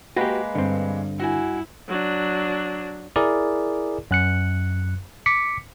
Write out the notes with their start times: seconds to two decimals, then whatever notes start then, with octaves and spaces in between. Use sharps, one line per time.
0.16 G#3 A#3 F#4 G4 B4
0.55 G2 D3 C4
1.20 E4 F#4 G#5
1.88 F#3 D4
3.16 E4 G#4 A#4 D5
4.11 F#2 F#6 C#7
5.26 D6 B6 C#7